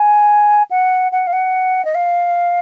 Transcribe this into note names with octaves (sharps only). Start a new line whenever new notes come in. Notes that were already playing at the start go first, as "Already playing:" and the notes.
Already playing: G#5
F#5
F#5
F5
F#5
D#5
F5